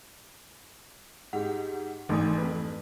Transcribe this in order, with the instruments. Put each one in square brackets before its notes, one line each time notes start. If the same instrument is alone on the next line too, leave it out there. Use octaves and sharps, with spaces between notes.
[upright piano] G#2 G4 [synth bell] F#5
[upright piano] G#1 [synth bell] E3 A3 D#6
[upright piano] F2 B4